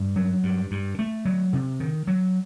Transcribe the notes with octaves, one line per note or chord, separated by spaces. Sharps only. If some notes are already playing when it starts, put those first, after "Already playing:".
Already playing: G2
F#3
G2
G2
A3
F#3
C3
D#3
F#3